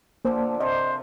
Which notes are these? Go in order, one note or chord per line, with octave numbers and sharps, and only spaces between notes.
A#2 D3 F3 A#3 C5
C3 F4 C5 D#5